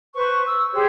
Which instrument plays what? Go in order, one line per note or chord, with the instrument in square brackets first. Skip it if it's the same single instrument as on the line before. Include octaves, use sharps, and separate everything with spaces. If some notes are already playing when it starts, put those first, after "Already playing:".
[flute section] B4 C5 C#6
E6
G4 G#4 C5 C#5